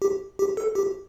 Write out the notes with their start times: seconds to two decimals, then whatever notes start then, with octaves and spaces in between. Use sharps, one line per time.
0.02 G4
0.39 G4
0.57 A4
0.75 G4